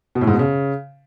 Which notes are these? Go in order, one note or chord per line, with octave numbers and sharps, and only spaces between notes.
B2
A2
G#2
B2
C#3